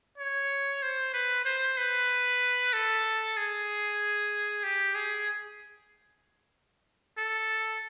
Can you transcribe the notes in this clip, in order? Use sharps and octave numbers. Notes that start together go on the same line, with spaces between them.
C#5
C5
B4
C5
B4
A4
G#4
G4
G#4
A4